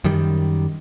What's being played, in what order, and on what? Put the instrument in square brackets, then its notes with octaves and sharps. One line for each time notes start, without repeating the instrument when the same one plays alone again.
[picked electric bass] F#2 D#3 G3